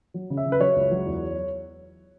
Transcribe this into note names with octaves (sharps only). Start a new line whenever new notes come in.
F#3
C#3
E5
C#3
B4
F#3 C#5
C#2
F#3
E2